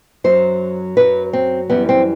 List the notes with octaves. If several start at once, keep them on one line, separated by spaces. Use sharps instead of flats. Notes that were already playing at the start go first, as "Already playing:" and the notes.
F#2 F#3 C5
F#2 F#3 B4
C4
F#2 E3 G3 B3
C4